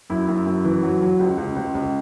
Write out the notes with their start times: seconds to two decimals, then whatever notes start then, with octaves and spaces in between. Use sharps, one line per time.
0.10 F#2 E4
0.28 F#2
0.47 F#2
0.65 E3
0.83 F#3
1.01 F#3
1.19 C#2
1.38 C#2
1.56 C#2
1.75 C#2